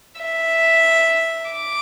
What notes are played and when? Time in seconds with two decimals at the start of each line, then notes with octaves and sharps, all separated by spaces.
0.21 E5
1.51 D6